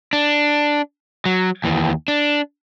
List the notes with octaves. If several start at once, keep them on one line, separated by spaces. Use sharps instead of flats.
D4
F#3
D#2 E3
D4